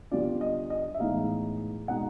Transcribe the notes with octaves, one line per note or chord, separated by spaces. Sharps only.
D3 G3 B3 D4 F4 D5
D#5
D#5
E5
A2 E3 G#3 B3 D#4 F5
B2 G#3 B3 D#4 F#5